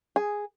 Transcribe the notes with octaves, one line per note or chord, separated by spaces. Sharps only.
G#4